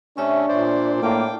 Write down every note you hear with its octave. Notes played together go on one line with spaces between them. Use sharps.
C3 A3 C#4 D4 C#5 E5 C#6
A#2 C5 D5
A2 A#3 G5 A5 D6